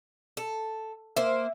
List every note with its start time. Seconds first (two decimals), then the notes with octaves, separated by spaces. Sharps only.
0.37 A4
1.17 A#3 C5 E5